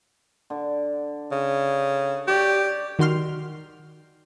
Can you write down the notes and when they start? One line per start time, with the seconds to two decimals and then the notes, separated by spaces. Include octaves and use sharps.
0.50 D3
1.32 C#3
2.28 G4 C#5 D5
2.99 D#3 F#4 C6 F6